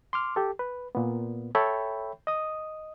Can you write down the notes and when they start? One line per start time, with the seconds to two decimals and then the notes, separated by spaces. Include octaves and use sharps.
0.13 C6 D6 F6
0.36 G4 A4
0.59 B4
0.95 A#2 B3
1.55 A4 C#5 E5 G5 B5
2.27 D#5 D#6